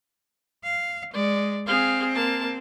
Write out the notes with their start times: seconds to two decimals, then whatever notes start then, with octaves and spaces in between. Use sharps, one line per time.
0.64 F5
1.13 G#3 D5
1.66 C4 G#4 F5
2.15 A#3 A5